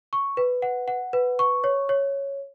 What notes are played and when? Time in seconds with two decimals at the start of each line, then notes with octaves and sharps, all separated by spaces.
0.13 C#6
0.37 B4
0.62 F#5
0.88 F#5
1.13 B4
1.39 C#6
1.64 C#5
1.89 C#5